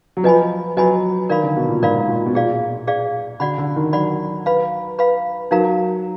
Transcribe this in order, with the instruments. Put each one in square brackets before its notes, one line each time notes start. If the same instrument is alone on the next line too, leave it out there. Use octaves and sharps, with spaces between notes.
[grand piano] F#3
[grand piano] F3 [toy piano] B4 D#5 G#5 B5
[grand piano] F#3 [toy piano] B4 D#5 G#5 B5
[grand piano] D#3 [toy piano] A#4 D5 F5 B5
[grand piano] D3
B2
A#2
[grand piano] G#2 [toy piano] A#4 D5 F5 B5
[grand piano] A#2
B2
[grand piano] A#2 [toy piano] G#4 D5 F5
[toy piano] G#4 D5 F5
[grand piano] D3 [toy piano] F#4 D5 F#5 B5
[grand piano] D3
D#3
[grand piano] F#3 [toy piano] F#4 D5 F#5 B5
[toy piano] B4 F5 B5
B4 F5 B5
[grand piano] F#3 [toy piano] D#4 A#4 F5 A#5